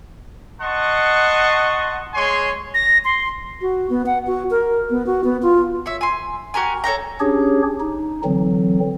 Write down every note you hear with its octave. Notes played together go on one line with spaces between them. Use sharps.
D#5 F#5 A5 C6 C#6
G#3 C#5 G#5 C6
A#6
C6
F#4
B3
F#5
F#4
A#4
B3
F#4
B3
F4
C#5 E5
G#5 C6
F#4 G4 A#4 G#5
A4 C#5 G5 A#5
C#4 D4 G4 G#4 C#5
D#4
D3 E3 F#3 C4